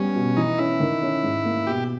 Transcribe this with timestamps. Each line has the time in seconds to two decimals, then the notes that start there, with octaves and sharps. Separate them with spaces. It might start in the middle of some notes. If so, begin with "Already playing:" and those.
Already playing: G3 B3 C#4
0.16 B2
0.37 E3 D#4
0.58 C#4 E4
0.80 D#3
1.02 C#4
1.23 G#2
1.45 A#3
1.67 B2 G4